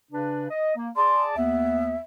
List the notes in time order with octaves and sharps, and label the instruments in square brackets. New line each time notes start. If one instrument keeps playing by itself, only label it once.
[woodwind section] C#3 D4 B4
D#5
A#3
[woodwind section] G#4 D5 A5 [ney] C6
[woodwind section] D#2 B3 [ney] E5